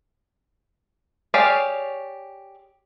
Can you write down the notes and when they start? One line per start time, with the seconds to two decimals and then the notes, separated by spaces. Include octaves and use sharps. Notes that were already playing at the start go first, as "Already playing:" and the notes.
1.34 G4 G#4 C#5 D5 F5